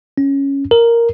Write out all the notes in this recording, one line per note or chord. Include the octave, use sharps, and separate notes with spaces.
C#4
A#4